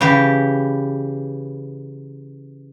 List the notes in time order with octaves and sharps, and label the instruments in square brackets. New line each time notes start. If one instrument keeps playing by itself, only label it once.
[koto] C#3 E3 G4